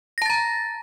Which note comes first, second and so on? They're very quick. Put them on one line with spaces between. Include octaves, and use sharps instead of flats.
A#6 A5 A6 A#5